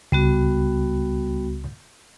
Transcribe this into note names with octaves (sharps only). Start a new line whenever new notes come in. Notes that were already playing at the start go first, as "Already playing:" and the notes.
C#2 G3 B3 F#4